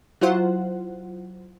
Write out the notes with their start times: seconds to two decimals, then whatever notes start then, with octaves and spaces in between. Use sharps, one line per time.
0.21 F#3 E4 F4 C5 F#5